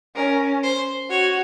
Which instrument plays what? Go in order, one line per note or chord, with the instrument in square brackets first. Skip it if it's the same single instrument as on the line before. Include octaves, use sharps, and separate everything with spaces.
[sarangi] C#4 [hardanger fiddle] A#4
[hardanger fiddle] C5
[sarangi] F#4 [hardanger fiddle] C#5